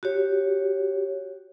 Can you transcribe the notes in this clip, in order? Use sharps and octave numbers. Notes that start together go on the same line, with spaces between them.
F#4 G4 C#5